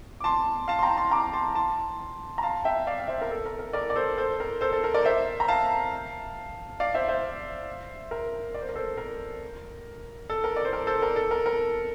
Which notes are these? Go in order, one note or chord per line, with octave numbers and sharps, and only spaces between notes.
D6
A5 C6
F5 A5
C6
G5 A#5
A5 C6
A#5 D6
A5 C6
A5 C6
A#5
F5 A5
E5 G5
D5 F5
F5
C5 E5
A#4
A4
A#4
A#4
A#4 D5
D5
A4 C5
A4 C5
A#4
A4 C5
A4
A#4
A#4 D5
C5 E5
A#5
F5 A5
D5 F5
C5 E5
C5 E5
A#4
D5
C5
A#4
A4 C5
A#4
A4
A#4
D5
C5
A#4
A4 C5
A#4
A4
A#4
A#4